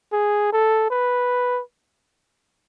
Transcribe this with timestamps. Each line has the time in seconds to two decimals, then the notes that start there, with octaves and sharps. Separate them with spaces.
0.13 G#4
0.52 A4
0.90 B4